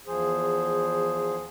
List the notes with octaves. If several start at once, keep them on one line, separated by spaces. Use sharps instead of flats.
E2 F3 G#4 C5